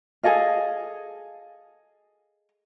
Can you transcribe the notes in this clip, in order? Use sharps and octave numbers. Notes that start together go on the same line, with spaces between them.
G#4 A4 D#5 F5